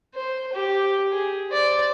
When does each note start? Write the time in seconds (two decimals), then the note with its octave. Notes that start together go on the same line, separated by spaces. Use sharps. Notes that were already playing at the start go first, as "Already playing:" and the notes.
0.15 C5
0.53 G4
1.12 G#4
1.51 C5 D5